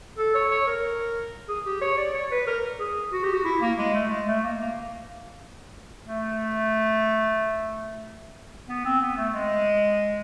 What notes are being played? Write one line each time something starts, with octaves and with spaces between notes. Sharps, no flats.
A4
C#5
C#5
A#4
G#4
G4
C#5
D5
C#5
B4
A#4
G#4
F#4
G4
F#4
E4
A#3
G#3
A3
G#3
A3
A#3
A#3
A3
B3
C4
B3
A3
G#3